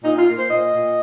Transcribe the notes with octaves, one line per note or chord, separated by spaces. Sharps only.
A#2 D#4
F4
A#3
C5
A#2 D#5
A#2